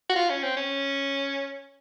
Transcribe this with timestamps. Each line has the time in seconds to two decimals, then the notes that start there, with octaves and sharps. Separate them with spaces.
0.10 F#4
0.16 F4
0.30 C#4
0.43 C4
0.57 C#4